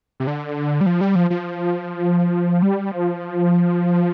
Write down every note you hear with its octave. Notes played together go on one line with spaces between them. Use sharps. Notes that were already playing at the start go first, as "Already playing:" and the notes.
C3
D3
G3
F3
G3
F3
F3
G3
F3